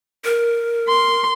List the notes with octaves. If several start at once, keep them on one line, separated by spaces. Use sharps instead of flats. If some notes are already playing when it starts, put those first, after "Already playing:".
A#4
C6